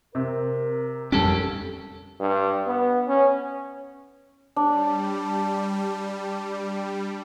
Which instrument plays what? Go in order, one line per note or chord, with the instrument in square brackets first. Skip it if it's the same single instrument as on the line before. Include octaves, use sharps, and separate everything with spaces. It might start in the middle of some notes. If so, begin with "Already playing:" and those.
[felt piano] C3 [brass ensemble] A#4
[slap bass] F2 G3 C#4 [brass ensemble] D3 A#4 A5 [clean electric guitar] G4 A4
[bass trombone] G2
B3
C#4
[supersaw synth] G3 [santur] D4